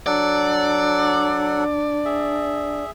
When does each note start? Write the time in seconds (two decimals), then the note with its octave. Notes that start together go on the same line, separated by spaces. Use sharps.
0.07 F#3 D4 A4 D5 F#5
2.05 G#4 E5